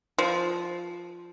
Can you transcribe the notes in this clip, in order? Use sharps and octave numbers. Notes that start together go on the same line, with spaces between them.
F3